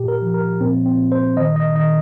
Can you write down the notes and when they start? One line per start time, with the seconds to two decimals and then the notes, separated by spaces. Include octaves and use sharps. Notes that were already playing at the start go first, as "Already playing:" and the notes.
Already playing: A#2 G4
0.08 A#4
0.22 F3
0.34 A#4
0.60 A#2 C4
0.85 C4
0.98 A#2
1.12 C5
1.37 D#3 D#5
1.56 D#5
1.75 D#3 D#5